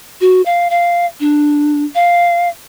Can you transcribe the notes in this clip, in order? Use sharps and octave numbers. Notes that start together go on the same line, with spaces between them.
F#4
F5
F5
D4
F5